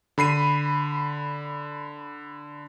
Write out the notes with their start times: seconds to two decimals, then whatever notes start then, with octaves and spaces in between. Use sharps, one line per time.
0.18 D3 B5 C7 D#7